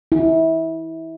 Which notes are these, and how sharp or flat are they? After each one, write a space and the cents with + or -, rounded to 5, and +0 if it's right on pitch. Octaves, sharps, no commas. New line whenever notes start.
E4 -25